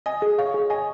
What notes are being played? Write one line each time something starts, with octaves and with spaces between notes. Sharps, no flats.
D#5 G#5
G#4
C#5 F5
G#4
D#5 G#5